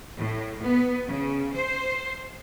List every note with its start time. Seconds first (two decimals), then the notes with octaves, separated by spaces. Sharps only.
0.16 A2
0.62 B3
1.07 C#3
1.54 C5